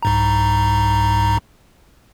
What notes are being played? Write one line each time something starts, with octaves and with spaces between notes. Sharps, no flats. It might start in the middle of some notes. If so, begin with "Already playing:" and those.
C2 G#2 A#5